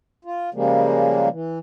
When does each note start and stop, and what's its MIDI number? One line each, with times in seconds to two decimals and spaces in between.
0.25 0.50 65
0.54 1.28 49
0.54 1.28 53
0.54 1.28 55
0.54 1.28 56
0.54 1.28 58
1.31 1.59 52